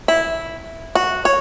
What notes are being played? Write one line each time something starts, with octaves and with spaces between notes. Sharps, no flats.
E4
F#4
C#5